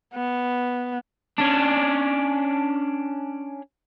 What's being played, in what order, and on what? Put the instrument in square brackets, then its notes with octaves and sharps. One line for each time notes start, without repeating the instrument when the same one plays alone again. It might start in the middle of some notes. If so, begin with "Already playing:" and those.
[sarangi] B3
[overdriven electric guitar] C#4 D4